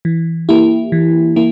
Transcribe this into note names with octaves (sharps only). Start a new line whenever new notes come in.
E3
A#3 E4 G4
E3
A#3 E4